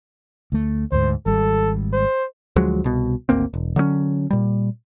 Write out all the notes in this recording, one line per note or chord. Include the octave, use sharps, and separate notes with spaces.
D2 A3
D2 G#2 C5
G#1 G3 A4
C5
D2 F3 F#3 G#3
C2 B2
G#1 D2 A#3 C4
E1
D3 F#3 A#3 C#4
A#2 G3